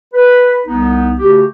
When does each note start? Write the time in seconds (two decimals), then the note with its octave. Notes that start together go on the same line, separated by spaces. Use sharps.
0.14 B4
0.67 C2 B3 D#4
1.18 C#3 A3 F#4 G4